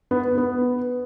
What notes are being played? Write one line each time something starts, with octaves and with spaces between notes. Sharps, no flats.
B3
B3